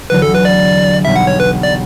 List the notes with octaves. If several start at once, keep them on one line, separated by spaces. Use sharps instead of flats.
E2 D3 F#3 B4
A4
B4
D5
B1 B2 G3 B3 E5
F#5
C#5
B4
D5